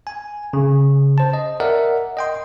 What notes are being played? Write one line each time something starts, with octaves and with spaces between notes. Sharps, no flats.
G#5
C#3
C5 A5
D#5
A#4 D5 E5 F#5
D#5 G5 C6